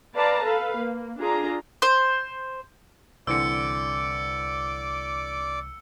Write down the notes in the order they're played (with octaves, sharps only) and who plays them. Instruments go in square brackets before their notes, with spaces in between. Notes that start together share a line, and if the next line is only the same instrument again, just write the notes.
[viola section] B4 D5 F5 A5 A#5
A4 B4 F5
A#3
D4 F4 G#4 A#5
[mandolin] C5
[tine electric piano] C2 [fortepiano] D3 E3 C4 [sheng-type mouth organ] D5 D6 [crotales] E6 C#7